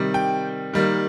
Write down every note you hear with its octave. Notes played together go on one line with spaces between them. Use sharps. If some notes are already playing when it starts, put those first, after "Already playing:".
Already playing: C3 D#3 G3
G5
D#3 G3 A#3